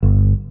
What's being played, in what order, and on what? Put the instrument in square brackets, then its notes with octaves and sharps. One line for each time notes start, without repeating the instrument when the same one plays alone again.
[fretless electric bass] G1